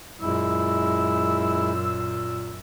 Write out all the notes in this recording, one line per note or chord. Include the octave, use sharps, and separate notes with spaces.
F#2 A#2 G#3 E4 E6